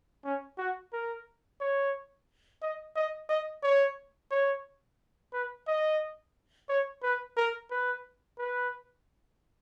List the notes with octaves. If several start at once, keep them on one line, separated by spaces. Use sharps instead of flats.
C#4
F#4
A#4
C#5
D#5
D#5
D#5
C#5
C#5
B4
D#5
C#5
B4
A#4
B4
B4